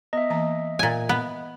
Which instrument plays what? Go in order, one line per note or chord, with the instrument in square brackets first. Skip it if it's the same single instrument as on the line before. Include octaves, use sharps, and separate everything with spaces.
[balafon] B3 [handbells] D#5 E5
[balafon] E3 A#3 A#5
[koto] A#2 G#5
B3